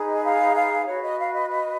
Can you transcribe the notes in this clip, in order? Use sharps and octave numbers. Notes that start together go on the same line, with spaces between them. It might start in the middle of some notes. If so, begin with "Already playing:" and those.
Already playing: D#4 G#4 B4
D#5
F5
F5
F#4 B4 C#5
D#5
F5
D#5
D#5